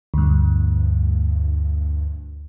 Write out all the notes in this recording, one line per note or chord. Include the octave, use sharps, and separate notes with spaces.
D2 G2